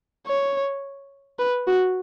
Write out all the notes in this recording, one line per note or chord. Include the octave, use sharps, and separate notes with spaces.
C#5
B4
F#4